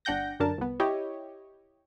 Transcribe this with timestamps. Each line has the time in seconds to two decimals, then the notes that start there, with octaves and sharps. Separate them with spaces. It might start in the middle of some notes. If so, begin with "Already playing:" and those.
0.05 G1 D4 F#5 G5 G6 A#6
0.40 F#2 D3 D4 A#4 A5
0.58 C2 B3
0.80 E4 G4 C#5 D#5